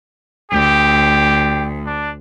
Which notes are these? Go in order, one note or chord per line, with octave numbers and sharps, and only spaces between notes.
D2 G4
D4